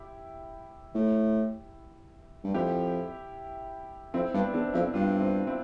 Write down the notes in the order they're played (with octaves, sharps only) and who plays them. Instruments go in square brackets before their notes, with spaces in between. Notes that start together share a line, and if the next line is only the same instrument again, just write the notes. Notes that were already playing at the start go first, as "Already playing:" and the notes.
Already playing: [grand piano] E4 G4
[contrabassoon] A2
G2
[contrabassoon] F2 [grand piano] E4 G4
[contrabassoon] F2 [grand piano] C4 E4
[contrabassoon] G2 [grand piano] B3 D4
[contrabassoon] E2 [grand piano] B3 D4
[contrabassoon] F2 [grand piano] C4 E4
[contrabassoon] G2 [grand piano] D4 F4
[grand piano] C4 E4
C4 E4